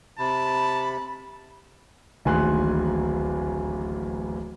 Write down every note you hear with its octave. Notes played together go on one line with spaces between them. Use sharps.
C3 A5 B5
D1 A1 D#2 G#5 C6 F#6